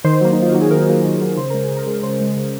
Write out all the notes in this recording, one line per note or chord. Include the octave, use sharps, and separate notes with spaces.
D#3 C5
F#3 A#3
D#4
D#3 F4
F#3 A#3 F#4
G#4
D#3 A#4
F#3 A#3
D#3
F#3 A#3
C#3 C5
G#3 A#4
G#4
C#3
A#4
G#3
C#3 C5
G#3
C#3